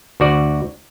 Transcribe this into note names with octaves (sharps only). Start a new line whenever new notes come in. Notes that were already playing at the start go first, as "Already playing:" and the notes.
D2 F#4 D5